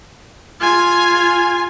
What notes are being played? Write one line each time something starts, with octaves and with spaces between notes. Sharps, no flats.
F4 G#5